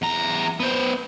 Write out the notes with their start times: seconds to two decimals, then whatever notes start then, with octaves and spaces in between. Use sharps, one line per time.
0.02 E2 A#5
0.60 B3 C5